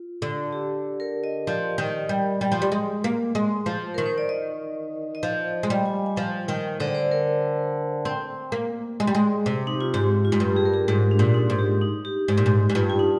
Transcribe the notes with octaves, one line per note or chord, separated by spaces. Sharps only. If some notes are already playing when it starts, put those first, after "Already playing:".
Already playing: F4
D3
G4
A#4
D#5
F3 D5
D#3
G3
G3
F3
G3
G#3
A#3
G#3
F3
D#3 A#4
C5
D5
D#5
D#5
F3 F5
G#3
G3
G#5
G#5
F3 G5
D#3 G5
D3 C5
D5
C5
A#4
C4
A#3
G#3
G3
G#3
C3
D#4
F4
G#2 G4
F4
G#2
G2
G#4
A#4
G#4
G#2 G4
D4
A#2
D#4
G#2
G4
D#4
G4
G#2 G4
A#2
G#2
G#2
G2 F4
F4
D#4